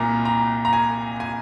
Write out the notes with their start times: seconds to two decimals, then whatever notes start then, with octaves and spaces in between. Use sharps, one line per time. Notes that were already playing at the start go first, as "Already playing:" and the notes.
Already playing: C2 A#2 A#5
0.25 A#5
0.65 A#5
0.73 G#5
1.20 G#5